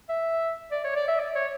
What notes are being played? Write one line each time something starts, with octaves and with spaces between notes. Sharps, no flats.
E5
D5
C#5
D5
E5
D5
C#5